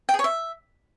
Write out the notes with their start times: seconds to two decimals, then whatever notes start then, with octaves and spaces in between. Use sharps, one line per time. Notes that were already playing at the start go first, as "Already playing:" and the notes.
0.09 G5
0.14 G#4
0.19 C#5
0.24 E5